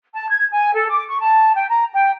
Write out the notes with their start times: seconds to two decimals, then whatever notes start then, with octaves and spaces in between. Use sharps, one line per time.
0.13 A5
0.30 G#6
0.51 G#5
0.74 A4
0.90 D6
1.08 C#6
1.21 A5
1.55 G5
1.69 A#5
1.93 G5